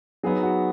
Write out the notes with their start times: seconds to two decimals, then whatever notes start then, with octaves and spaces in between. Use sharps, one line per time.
0.23 F#3 B3 D#4 G#4
0.43 F#4